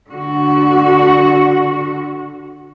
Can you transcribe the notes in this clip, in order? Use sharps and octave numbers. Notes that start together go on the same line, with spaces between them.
D3 F#4